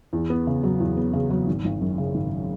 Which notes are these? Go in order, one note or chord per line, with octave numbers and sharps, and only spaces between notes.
E2
B3
C#3
F#3
E2
B3
C#3
F#3
G#1
G#1
F#2
C#3
G#1